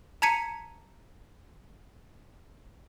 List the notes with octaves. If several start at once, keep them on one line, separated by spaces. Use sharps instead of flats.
A5 A#5 G#6 B6 C#7 D#7